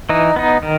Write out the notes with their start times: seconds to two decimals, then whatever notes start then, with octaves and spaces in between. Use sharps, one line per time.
0.09 E3 D#4
0.36 B3 D#4
0.63 D#3